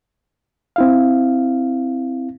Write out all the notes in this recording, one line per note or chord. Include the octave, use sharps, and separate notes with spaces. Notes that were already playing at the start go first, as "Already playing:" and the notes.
C4 E4 F5